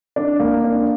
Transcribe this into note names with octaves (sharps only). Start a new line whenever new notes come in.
D4
A#3
D4